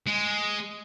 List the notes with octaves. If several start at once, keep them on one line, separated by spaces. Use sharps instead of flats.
G#3